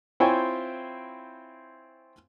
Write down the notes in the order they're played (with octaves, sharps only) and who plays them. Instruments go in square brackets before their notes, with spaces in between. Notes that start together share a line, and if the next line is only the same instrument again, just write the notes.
[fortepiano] C4 E4 F4 C#5 G5 G#5